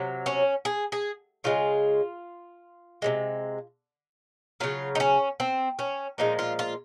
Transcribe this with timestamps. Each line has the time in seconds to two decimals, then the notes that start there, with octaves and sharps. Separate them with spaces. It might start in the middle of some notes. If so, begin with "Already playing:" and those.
Already playing: C3 F#3
0.26 C#4
0.65 G#4
0.92 G#4
1.44 C#3 G#3 F4
3.02 C3 F3 G#3
4.60 C#3 F#3 F4
4.95 D#4
5.00 C#4
5.40 C4
5.79 C#4
6.18 A#2 F3 G#3 D#4
6.39 F4
6.59 F4